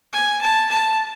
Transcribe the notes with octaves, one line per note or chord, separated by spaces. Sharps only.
G#5
A5
A5